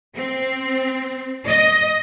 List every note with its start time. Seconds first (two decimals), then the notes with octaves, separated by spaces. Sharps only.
0.15 C4
1.47 D#5